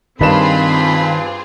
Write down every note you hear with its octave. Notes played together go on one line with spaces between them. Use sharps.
G2 D#3 G3 C4 F4 G#4 B5 E7